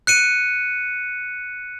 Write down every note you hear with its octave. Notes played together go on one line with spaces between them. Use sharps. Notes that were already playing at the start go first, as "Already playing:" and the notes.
F#6 C#7 D#7